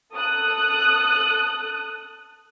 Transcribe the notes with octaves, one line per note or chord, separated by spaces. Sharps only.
A4 D#6 F#6